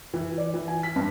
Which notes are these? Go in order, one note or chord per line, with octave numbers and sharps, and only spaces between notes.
E3
D5
E3
G#5
B6
G2